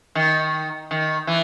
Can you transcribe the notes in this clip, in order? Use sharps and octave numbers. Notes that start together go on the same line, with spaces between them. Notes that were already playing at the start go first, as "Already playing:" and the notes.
D#3
D#3
E3